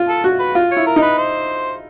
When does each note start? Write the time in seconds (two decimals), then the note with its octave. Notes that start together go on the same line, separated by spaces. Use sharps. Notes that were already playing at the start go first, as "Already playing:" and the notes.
Already playing: F4
0.09 A4
0.24 F#4
0.39 B4
0.55 F4
0.71 E4 C#5
0.87 A#4
0.96 D#4
1.02 B4
1.18 C5